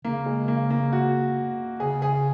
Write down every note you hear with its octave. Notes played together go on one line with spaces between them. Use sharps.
C#3 A#3
G#3
A#3
A#3
F#4
C#3 G#4
G#4